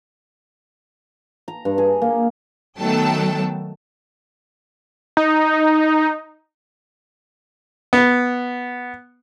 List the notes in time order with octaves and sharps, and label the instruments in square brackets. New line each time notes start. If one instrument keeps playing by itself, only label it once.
[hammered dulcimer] A#5
G2
G#4
A#3
[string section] D#3 F#3 A3 B3 G5 A5
[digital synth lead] D#4
[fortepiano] B3